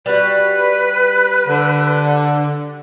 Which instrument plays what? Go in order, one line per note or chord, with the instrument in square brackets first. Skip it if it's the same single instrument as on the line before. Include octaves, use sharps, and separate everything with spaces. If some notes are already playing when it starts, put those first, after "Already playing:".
[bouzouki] G3 F#4 [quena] B4
[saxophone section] D3